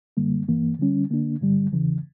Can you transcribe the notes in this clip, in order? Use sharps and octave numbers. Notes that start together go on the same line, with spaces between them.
F#2 D3 G3 A#3
G2 E3 A#3
D3 G3 C#4
D3 A#3 D4
G2 D3 G3
E2 C#3 E3